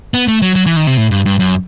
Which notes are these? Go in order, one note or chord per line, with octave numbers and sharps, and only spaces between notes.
B3
A3
F#3
F#3
E3
D#3
C3
A2
G2
G2
F#2